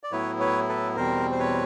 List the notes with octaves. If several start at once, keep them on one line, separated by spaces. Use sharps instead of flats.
D5
A2 F#3 B3 E4 B4 C#5
B4 C#5
A4 B4
E2 B2 G3 C4 A#4 C5
C5
B4 C#5